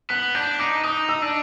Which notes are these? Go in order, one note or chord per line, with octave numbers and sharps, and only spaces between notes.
B3 F#6
D4 G6
D#4 D6
D#4 D#6
E6
D4